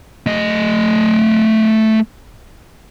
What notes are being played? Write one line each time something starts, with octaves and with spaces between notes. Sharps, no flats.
A3 D#5